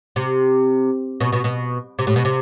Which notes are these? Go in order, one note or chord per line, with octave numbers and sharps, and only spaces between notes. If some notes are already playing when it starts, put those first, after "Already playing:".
C3
B2
B2
B2
C3
A2
B2
C3